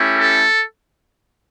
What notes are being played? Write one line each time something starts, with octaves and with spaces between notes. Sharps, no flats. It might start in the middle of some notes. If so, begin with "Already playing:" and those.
Already playing: A3 C#4 E4 G4
A4